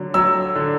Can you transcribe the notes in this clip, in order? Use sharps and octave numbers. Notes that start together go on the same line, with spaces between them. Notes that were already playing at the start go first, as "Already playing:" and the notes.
Already playing: D3 F#3
F#3 E6
D3